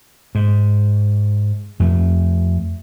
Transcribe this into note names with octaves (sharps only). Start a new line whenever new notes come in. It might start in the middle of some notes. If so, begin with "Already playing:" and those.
G#2
F2 A3